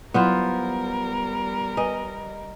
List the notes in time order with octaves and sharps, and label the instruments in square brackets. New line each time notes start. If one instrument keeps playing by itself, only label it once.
[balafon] F#3 E4 [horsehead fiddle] G3 A#4 [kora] B3 F4 C5
[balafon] B4 G#5 [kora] D#5